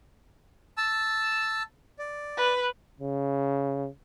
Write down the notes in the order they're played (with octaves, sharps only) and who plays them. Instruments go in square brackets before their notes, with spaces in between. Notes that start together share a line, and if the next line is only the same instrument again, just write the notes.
[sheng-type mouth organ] A5 E6
D5
[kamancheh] B4
[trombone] C#3